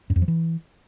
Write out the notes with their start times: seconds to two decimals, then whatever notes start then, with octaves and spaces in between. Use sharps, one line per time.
0.10 F#2
0.16 F2
0.22 F3
0.28 E3